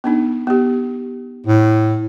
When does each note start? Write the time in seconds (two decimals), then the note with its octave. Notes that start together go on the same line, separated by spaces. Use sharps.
0.04 B3 D4 D#4
0.47 B3 G4
1.47 A2